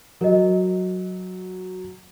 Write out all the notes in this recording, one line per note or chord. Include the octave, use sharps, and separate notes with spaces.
F#3 A#4 D#5